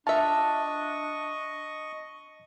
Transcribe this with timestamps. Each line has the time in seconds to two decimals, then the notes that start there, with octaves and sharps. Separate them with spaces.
0.07 D4 F4 D#5 E5 A5 C#6